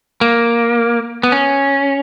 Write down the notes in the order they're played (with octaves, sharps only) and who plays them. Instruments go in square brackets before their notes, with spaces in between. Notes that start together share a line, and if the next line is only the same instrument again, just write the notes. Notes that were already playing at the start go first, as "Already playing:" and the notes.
[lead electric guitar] A#3
B3
C#4